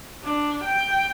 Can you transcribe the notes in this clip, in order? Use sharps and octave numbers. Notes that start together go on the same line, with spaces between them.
D4
G5